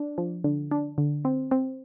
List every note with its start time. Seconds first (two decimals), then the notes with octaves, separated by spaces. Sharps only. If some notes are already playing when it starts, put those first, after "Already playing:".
Already playing: D4
0.18 F3
0.44 D3
0.71 D4
0.98 D3
1.25 C4
1.51 C4